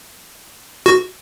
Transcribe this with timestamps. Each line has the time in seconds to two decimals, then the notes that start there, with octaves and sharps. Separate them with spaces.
0.86 F#4